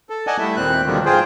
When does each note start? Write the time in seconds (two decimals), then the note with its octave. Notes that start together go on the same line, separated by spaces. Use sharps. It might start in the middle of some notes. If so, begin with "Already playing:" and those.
0.10 A4
0.27 D5 D#5 F#5 G#5 A5
0.39 G3 A3 E4 E5
0.56 D#2 A#2 C4 F#6
0.86 B2 D3 D#3 F3 G3
1.05 G#2 F4 G#4 C5 G5